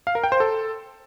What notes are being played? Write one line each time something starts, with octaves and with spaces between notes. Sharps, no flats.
F5
A#4
G5
C5
A4